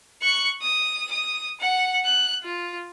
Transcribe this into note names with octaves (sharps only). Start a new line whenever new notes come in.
C#6 F#6
D#6
D#6
F#5
F#6
F4